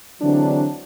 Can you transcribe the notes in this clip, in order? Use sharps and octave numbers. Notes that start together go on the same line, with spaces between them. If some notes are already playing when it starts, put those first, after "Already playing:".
D3 E3 F#3 G#3 C4 D4